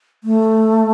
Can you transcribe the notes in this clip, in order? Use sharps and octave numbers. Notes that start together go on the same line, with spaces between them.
A3